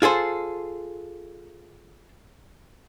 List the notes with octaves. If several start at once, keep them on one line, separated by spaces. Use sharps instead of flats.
F4 G#4 A4 C5